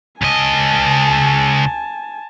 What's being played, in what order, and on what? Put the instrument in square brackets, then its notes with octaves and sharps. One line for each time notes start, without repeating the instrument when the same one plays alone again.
[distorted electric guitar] C#2 D#5 [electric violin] G#5 A5